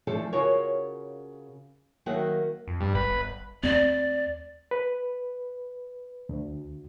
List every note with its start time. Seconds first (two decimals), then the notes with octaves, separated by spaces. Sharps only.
0.07 E3 F3 A3 D4 A4
0.33 C#3 F4 F#4 A#4 C#5
2.06 D#3 F#3 A#3 F#4 E5 F#5
2.68 F2
2.80 G2
2.95 G#1 B4
3.10 G1
3.63 D#2 A3 C4 D5
4.71 B4
6.29 D2